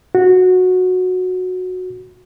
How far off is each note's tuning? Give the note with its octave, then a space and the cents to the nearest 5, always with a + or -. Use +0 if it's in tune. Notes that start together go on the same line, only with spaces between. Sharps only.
F#4 -10